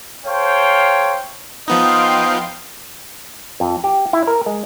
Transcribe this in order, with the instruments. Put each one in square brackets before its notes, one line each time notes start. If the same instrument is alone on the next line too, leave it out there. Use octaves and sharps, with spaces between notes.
[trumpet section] A4 C5 C#5 F5 G5
[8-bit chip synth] F3 B3 D#4 [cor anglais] D#5 [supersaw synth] F5 G5 C6
[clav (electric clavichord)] F2
G4
E4
A#4
G#3